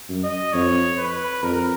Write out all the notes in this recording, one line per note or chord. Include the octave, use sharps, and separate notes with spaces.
F#2
D#5
F2 C#5
B4
F2 A#4